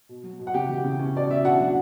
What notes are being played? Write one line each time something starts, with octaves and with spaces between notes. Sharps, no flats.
B2
F#3
B2
F#5
C#3 G4 G5
E3
C#3
C#4
B2 D5
E2 E5
D4 F#4 F#5
F#3